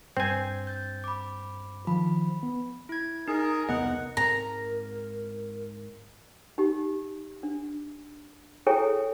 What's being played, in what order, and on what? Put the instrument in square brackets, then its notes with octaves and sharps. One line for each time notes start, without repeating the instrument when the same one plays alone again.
[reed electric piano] G2 [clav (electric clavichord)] C4 G#5 [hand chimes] G6 C7
[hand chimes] G6 A6
B5 D6
[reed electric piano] D#3 F3 [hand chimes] B5
[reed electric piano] B3
[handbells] E4 G#6
[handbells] D#4 [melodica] G#4 [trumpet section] A#4
[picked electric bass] E1 C2 B3 [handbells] D#5 [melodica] F#5
[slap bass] G#2 C4 [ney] A#4 [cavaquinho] A#5
[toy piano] D#4 G4
D4
E4 G#4 A4 C#5 G5 G#5